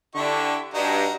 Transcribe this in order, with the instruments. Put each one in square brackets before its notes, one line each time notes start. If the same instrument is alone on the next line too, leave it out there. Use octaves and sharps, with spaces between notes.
[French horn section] D3 [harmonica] E4 G4 C#6
[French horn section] G2 [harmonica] D#4 F#4 A#5